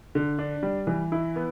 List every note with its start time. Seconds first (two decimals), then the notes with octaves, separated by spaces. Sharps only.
0.15 D3
0.39 D4
0.63 G3
0.87 E3
1.12 E4
1.36 B3